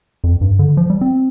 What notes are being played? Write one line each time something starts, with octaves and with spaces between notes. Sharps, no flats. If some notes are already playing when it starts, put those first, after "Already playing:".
F2
G2
D3
F3
G3
C4